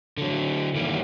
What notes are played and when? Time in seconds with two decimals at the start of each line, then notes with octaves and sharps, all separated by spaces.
0.17 D3 F#3
0.76 D#3 E3 G3 A#3